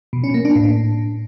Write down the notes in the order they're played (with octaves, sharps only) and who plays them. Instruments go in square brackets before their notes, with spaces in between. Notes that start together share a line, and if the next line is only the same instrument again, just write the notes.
[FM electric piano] B2
C#4
A#3
D4
A2